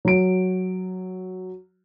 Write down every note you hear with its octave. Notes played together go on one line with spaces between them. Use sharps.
F#3 D7